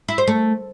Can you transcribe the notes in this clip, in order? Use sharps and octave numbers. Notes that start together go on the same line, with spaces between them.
E4
C5
A3